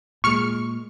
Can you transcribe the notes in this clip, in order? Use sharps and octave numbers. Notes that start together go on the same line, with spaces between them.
A#2 G#3 C#6 F6 C#7